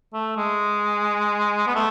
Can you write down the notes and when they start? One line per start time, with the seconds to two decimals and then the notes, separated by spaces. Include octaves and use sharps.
0.13 A3
0.37 G#3
1.67 B3
1.75 A3